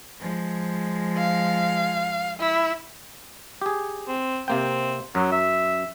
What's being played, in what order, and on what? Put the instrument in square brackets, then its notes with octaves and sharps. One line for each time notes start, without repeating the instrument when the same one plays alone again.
[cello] F3 G#3
[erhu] F5
E4
[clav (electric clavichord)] G4 G#4
[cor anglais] C4
[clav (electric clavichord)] C3 A#3 G5 [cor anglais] C4
[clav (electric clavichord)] F#2 [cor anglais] F#3
[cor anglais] E5